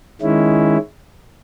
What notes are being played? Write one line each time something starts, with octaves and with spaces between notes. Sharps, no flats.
D#3 G#3 C#4 E4